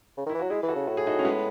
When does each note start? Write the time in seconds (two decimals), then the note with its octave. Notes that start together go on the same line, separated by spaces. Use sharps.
0.17 C#3
0.26 D#3
0.29 E3 E4
0.40 F#3 F#4
0.50 G#3 E4 G#4
0.63 E3
0.68 F#4 A4
0.76 C#3
0.87 A2 F#4
0.97 G#4
1.06 D#4 F#4
1.19 C#4
1.24 G#3 B3